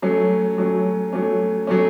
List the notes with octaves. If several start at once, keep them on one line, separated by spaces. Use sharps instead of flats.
F#3 A3 C#4
F#3 A3 C#4
F#3 A3 C#4
F#3 A3 C#4